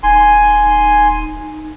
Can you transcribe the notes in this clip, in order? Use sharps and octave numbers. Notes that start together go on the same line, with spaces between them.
D#1 D#4 G#5 C6